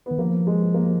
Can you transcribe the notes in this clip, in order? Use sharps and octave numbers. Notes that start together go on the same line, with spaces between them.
D#3 B3
F3 A#3
G#3
A#3